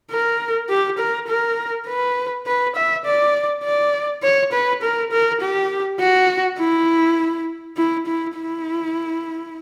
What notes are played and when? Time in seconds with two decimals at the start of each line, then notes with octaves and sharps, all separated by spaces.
0.11 A#4
0.69 G4
0.99 A#4
1.28 A#4
1.87 B4
2.47 B4
2.76 E5
3.05 D5
3.64 D5
4.23 C#5
4.52 B4
4.83 A#4
5.12 A#4
5.41 G4
6.00 F#4
6.59 E4
7.77 E4
8.06 E4
8.36 E4